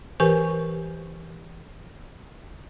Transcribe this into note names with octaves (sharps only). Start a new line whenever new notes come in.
E3 G4 A#4 B4 G#5 C#6